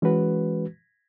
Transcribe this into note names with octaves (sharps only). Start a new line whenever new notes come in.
E3 G#3 C#4 F#4 B4